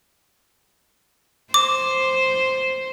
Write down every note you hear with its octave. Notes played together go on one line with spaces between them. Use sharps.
C5 D6